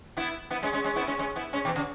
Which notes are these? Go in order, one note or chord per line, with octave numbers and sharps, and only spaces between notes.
B3 E4
B3 E4
G#3 C#4
G#3 C#4
G#3 C#4
B3 E4
G#3 C#4
G#3 C#4
B3 E4
G#3 C#4
B2 E3
C#3